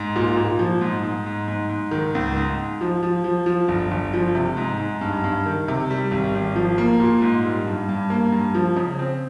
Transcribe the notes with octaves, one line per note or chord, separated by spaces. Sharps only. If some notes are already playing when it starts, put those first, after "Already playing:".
Already playing: G#2
A#2
A#2
F3
G#2
G#2
G#2
G#2
G#2
D#3
C#2
G#2
G#2
F3
F3
F3
F3
G1
G1
F3
C3
G#2
G#2
G2
G2
D#3
C3
G3
G#1
G#1
F3
A#3
A#2
G#2
G3
G2
G2
A#3
G2
F3
C#3
C4